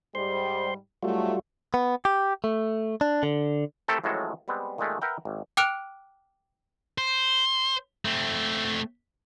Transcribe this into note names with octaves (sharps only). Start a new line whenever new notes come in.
G#2 G3 C5 C6
G#2 F#3 G3 A3 F4 F#4
B3
G4
A3
D4
D3
A3 C4 E4 G4 A4 A#4
A1 A2 F3 F#3 G#3 A4
G3 G#3 B3 C4
A#2 D#3 G#3 A3
A#4 B4 E5 F#5 G5 A#5
G#1
G5 D6 F6 F#6 D7 F7
C5
A3 C4